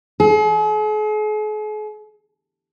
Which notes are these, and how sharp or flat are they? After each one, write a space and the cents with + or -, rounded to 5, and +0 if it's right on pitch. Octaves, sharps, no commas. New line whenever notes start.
G#4 +45